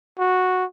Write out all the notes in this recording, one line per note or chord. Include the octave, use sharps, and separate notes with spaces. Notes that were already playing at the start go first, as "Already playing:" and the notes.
F#4